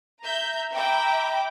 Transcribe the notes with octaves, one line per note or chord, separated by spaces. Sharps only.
E5 A#5 G6
E5 G5 A#5 B5 D6